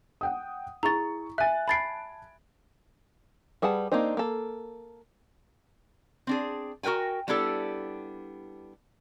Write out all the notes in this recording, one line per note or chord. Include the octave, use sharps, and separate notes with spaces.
F#5 G5 D#6
E4 G#4 A#5 C#6 A6
E5 G#5 F#6 A6
A5 B5 G#6 A6 C7 D7
G3 G#4 B4 F#5 A5
A#3 C4 D4 D#4 C5
A#3 A4
C4 D4 G#4
F#4 A#4 B4 G5 G#5
G3 B3 D4 E4 G4 A4